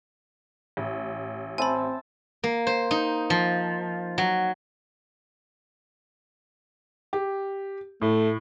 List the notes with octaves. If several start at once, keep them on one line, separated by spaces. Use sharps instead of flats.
A1
C4 C5 E5 G#5 A5 B5
A#3
C5
D#4
F3
F#3
G4
A2 A3